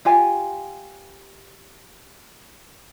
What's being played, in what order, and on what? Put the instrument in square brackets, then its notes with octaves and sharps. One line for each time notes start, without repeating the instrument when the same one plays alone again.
[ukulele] F4 G4 G#5